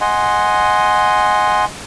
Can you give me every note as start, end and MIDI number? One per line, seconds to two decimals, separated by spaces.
0.01 1.65 75
0.01 1.65 78
0.01 1.65 80
0.01 1.65 84